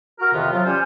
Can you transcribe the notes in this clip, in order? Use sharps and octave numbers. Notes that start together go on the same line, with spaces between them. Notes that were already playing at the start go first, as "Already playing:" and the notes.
F#4 A#4
F2 C3 D#3 B3 F4
F3 F#3 F4
G3 C#4 G4 C5